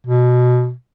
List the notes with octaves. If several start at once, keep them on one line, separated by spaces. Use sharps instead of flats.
B2